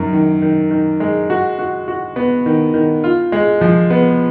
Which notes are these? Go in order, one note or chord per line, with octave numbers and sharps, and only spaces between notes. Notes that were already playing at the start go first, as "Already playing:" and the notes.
Already playing: F#2 D#3
D#3
D#3
D#3
G#3
F#4
F#4
F#4
B3
D#3
D#3
F4
G#3
F3
B3